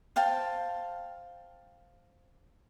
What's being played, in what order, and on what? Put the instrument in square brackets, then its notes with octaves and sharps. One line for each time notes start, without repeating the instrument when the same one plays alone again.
[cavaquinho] C5 F5 G5 A5